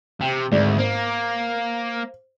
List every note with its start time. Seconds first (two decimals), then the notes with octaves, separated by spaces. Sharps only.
0.21 C3 G5
0.52 G#1 D2 G#3 D5
0.78 A#3 C5